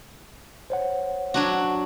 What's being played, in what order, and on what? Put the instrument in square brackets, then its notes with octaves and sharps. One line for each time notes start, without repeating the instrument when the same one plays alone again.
[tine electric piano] C5 C#5 F#5
[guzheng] F#3 D4 F#4